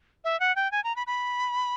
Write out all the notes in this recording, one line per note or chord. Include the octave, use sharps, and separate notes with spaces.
E5
F#5
G5
G#5
A#5
B5
B5